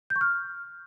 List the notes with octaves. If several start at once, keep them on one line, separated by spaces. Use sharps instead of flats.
G6
C#6
F6